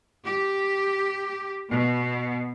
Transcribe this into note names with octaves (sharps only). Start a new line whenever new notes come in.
G4
B2